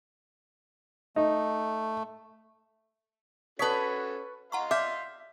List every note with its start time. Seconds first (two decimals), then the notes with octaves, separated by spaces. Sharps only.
1.16 A3 D#4
3.59 C#4 F#4 A4 B4 C#5 A5 D#6 B6
4.52 D#5 F5 F#5 A#5 C6 C#6
4.71 E5 D6 F6 G6